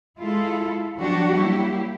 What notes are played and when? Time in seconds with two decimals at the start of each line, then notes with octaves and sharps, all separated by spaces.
0.18 G#3 E4 F4 A4
0.97 F3 F#3 B3 D4 F#4 G4
1.32 F#3 G3 A#3 E4 G4